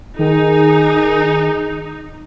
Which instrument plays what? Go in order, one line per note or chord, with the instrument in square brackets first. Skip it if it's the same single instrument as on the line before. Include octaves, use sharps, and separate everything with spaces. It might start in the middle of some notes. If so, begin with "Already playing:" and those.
[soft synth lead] D#3 [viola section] D#4 [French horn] G#4